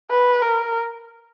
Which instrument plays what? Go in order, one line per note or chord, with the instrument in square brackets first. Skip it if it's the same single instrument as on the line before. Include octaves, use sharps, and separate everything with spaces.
[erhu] B4
A#4